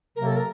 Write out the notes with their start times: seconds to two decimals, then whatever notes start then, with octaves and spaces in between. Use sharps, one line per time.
0.16 C3 F#3 A#3 A#4
0.26 A4
0.37 A#4